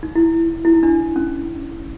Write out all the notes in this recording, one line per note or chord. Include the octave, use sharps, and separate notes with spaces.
D#4
E4
E4
D#4
D4
C#4